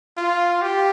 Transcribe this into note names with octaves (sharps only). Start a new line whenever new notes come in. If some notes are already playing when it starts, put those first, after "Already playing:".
F4
G4